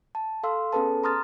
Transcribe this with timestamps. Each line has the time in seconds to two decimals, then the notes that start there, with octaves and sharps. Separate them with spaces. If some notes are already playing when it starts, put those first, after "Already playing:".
0.15 A5
0.43 A4 F5 C6 E6
0.73 B3 C#4 G#4 A4 B4 A5
1.04 A#5 C6 D#6 F6 A6